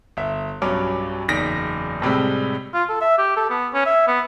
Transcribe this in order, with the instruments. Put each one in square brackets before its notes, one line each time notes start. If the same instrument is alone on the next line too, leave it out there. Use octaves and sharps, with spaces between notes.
[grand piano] G1 E5
B1 G2 F#3 C#4 D6
F#1 E2 D#4 A#6 B6 D7
A2 C3 G3 G#3
[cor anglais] F4
A4
E5
G4
A4
B3
C#4
E5
B3